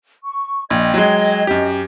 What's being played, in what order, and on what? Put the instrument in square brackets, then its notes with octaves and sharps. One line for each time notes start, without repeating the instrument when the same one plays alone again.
[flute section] C#6
[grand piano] A#1 [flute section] D#5 G5 G#6
[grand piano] F#3 G#3
[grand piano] F#2 G4 [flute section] D#5